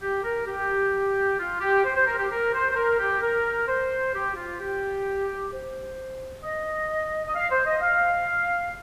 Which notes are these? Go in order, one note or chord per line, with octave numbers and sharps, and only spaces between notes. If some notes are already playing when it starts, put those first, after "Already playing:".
G4
A#4
G4
F4
G4
C5
C5
A#4
G4
A#4
C5
C5
A#4
G4
A#4
C5
G4
F4
G4
C5
D#5
D#5
F5
C5
D#5
F5